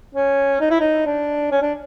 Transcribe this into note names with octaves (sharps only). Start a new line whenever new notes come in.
C#4
D#4
E4
D#4
D4
C#4
D4